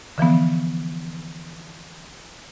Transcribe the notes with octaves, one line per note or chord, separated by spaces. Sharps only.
D3 E3 F3 B3